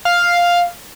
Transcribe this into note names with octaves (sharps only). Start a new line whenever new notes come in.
F5